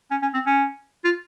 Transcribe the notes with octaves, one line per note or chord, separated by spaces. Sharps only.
C#4
C#4
C4
C#4
F4